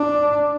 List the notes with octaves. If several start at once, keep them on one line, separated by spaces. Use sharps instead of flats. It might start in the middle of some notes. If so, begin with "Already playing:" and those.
Already playing: D4